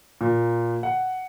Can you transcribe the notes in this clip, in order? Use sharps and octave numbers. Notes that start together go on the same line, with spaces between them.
A#2
F#5